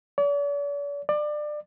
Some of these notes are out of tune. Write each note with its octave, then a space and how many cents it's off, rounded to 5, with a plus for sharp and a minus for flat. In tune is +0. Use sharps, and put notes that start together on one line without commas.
D5 -45
D5 +25